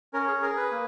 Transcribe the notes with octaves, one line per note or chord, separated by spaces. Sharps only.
C#4 A#4
G#4
G#4 A#4
B4
A#3